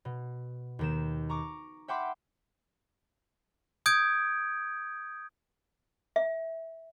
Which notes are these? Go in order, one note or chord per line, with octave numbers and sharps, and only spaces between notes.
B2
D#2 D#3 E7
A#5 C#6 D6
E5 F#5 G5 B5 C6 D6
D#6 G6 G#6 D7
E5